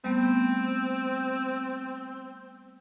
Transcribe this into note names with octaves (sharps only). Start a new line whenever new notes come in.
G3 A3 B3 C4